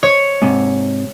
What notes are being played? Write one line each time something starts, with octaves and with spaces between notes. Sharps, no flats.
C#5
G#2 C3